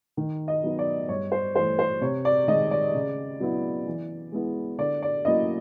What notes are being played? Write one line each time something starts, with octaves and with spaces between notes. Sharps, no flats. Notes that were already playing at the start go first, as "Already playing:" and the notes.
D#3
D#5
F#3 B3 D#4
D5
G2 C#5
C5
E3 A3 C5
C5
C3 C#5
D5
D#3 G#3 D#5
D5
C#3
F#3 B3 E4
E3
G#3 B3 E4
D3 D5
D5
F#3 A#3 C#4 E4 D#5